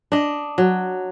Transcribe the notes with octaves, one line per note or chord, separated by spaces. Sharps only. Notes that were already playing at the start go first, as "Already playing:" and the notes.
D4 D#5
F#3